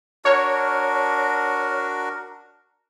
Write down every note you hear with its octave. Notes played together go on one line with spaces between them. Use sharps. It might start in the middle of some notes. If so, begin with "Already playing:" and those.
D4 F#4 A#4 C#5